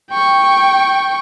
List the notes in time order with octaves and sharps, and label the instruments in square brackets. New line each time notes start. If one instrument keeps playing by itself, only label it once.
[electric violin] G5 C#6